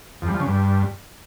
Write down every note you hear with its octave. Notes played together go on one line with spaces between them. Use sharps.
F2
G3
F3
C#3
G2